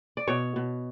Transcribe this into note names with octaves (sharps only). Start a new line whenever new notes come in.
D5
B2 C#5
B2